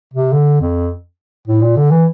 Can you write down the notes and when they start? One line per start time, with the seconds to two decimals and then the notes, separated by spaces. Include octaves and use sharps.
0.14 C3
0.33 D3
0.61 F2
1.48 A2
1.61 A#2
1.77 D3
1.91 E3